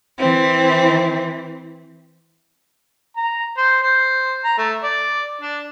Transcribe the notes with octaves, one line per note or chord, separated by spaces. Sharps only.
E3 C4
A#5
C5
C5
A#5
A3
D5
D4